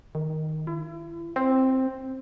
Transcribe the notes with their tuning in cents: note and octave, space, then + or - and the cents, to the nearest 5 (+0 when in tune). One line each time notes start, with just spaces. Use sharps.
D#3 +0
E4 +35
C4 +5